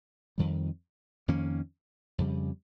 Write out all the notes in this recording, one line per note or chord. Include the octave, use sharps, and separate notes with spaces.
F2 D#3 G3
F2 D#3 A#3 C#4
F2 C#3 G3